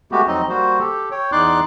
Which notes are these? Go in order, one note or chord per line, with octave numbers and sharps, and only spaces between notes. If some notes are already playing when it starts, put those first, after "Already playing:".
G#3 A3 B3 F#4 G4
F2 F#3 C4 D#4 D#5
G3 A#3 F#4 C5
G4 A4
C#5 G5
E2 D#4 D5 C6 D6 F#6